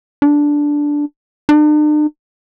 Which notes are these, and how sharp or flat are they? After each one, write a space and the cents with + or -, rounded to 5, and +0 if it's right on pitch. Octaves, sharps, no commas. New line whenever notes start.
D4 -5
D4 +45